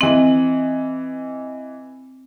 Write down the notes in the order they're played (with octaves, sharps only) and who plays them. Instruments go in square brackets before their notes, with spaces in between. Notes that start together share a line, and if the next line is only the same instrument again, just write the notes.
[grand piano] E3 D#5 F#7 [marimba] C4